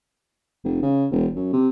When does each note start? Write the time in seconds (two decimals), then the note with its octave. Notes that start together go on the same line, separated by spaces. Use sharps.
0.64 F1
0.82 C#3
1.11 E1
1.36 F#2
1.53 C3